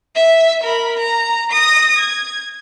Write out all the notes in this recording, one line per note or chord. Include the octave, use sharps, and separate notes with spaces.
E5
A#4 B5
A#5
D#6 A#6
G#6